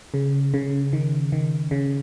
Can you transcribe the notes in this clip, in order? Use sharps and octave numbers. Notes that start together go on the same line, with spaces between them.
C#3
C#3
D#3
D#3
C#3